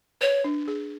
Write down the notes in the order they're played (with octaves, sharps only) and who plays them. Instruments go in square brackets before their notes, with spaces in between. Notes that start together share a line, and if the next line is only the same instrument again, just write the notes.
[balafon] B4 [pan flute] C#5
[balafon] D4
G#4